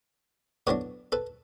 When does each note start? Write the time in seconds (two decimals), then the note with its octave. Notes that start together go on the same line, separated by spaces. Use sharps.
0.67 A2 F#3 B3 D4 B4 C#5
1.12 A4 B4